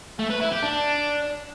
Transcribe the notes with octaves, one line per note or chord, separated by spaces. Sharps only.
A3
B4
E4
G4
D4